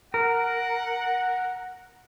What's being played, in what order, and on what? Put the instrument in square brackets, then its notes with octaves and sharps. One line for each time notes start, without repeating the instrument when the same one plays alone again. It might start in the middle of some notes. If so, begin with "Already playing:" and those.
[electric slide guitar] A#4 [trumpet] F#5